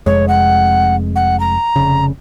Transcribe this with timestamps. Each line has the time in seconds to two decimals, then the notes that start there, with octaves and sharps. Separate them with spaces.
0.06 F1 F2 G#3 C#5
0.28 F#5
1.16 F#5
1.40 A#5
1.76 F1 C#3